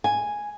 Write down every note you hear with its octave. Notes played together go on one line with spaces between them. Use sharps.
G#5